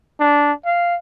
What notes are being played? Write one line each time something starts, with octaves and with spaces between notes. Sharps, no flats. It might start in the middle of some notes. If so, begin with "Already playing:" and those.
D4
F5